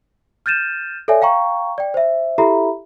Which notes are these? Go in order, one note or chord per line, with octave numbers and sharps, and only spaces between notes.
F6 G6 A6 D#7 E7
A4 C#5 D5 E5 G#5
F5 G5 A#5 C#6
D5 G5
C5 E5
E4 G4 A4 E5 A#5 B5